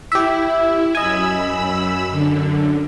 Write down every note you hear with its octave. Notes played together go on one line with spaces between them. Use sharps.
E4 G4 E5
F#2 D#5 G#5 B5 E6
F#2 D3